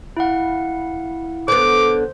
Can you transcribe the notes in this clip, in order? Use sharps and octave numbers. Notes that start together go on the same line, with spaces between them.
E4 F5 F#5
D3 B3 C5 D6